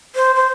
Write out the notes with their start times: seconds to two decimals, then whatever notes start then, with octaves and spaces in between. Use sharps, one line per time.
0.16 C5
0.36 C5